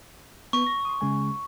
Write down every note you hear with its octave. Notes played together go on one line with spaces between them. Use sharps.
B3 B4 C#6
A#6
C6 D#6
C#3 G#3 G#5